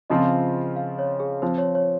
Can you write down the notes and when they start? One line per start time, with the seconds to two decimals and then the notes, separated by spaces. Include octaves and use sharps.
0.10 C#3 F3 C4 F4 D#5
0.76 F5
0.99 C#5
1.20 G#4
1.42 F3 C4 F4 C5
1.58 C#5
1.75 C#5